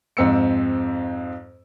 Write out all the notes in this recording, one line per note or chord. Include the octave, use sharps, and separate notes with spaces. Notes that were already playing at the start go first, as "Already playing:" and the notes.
F2 G#2 C4 E6 C#7